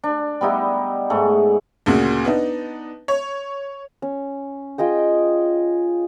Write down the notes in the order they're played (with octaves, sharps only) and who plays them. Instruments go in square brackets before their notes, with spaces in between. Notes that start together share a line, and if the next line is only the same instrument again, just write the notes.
[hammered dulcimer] D4
G3 B3 D#4 E4
G#2 A3 G#4
[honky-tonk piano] D2 A#2 C#3 F#4
B3 D4 D#4
C#5
[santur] C#4
F4 G#4 D#5 G5